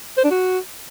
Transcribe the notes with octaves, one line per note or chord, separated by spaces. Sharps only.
C5
D4
F#4